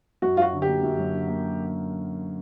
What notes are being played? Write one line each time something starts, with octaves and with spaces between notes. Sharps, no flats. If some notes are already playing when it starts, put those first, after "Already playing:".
F#2 F#4
F#3 F4 F#4
D3
G4
A#3
F#2
F#3
D3
A#3